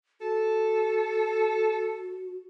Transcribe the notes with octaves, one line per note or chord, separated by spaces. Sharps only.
F#4 A4